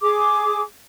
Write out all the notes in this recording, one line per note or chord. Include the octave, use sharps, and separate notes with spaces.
G#4 D6